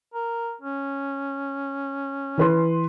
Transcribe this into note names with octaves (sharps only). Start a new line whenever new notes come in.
A#4
C#4
E3 B4 C6